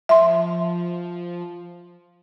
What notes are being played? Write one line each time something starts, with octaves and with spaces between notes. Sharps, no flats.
F3 E5 C6